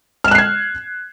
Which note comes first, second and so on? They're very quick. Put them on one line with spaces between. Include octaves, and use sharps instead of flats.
F6 E7 F#6 C7 G#6